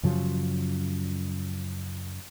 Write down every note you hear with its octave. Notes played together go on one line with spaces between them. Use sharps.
F#2 C#3 F3 F#3